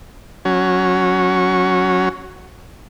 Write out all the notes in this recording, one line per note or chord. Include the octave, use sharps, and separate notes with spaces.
F#3 C#4